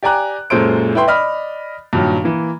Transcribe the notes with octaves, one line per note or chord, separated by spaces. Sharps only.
G4 D5 G#5 A#5 F#6
F#2 A#2 G#3 A4 C5 D7
E4 B4 G5 C6
D5 D#5 B5 F6
G2 A#2 D#3 F#3
E3 A#3